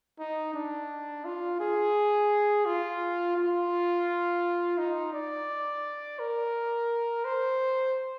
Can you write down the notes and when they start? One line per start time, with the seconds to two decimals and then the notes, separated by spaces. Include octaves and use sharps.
0.19 D#4
0.54 D4
1.25 F4
1.60 G#4
2.66 F4
3.37 F4
4.78 D#4
5.13 D5
6.19 A#4
7.25 C5